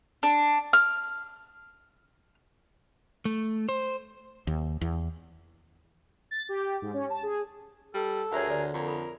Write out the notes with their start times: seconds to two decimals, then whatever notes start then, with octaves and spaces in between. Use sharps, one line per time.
0.23 D4
0.73 F6
3.25 A3
3.69 C5
4.47 D#2
4.81 E2
6.31 A6
6.49 G4
6.82 G#2
6.94 C#4
7.10 A5
7.23 G#4
7.94 G3 A4
8.32 D2 G#4 A#4 C#5 E5 F#5
8.50 D3 A4 D5
8.74 F2 A#4
8.88 A4 B5